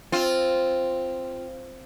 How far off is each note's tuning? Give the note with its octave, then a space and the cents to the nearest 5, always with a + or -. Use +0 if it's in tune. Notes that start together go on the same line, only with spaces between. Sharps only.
C4 +0 F4 -5